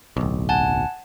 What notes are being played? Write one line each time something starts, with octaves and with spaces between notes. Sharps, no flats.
D1 B1
F#5 G#5 A5